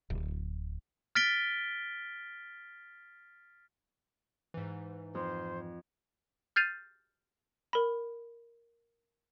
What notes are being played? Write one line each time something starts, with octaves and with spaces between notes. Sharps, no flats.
D1
F6 A6 B6 D7 G7
G#2 E3
F2 C5
F6 G6 A6 C7 D#7 F7
A#4 B5